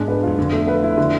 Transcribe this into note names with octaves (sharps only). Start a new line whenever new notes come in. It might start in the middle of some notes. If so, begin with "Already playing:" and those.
Already playing: G#2 G#3 D4
B4
E2 F4
F2 D3
A3
B4
E4
D3